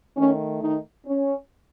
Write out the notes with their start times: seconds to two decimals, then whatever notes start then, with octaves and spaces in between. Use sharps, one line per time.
0.16 D#3 A3 C#4
0.61 D#3 D#4
1.06 C#4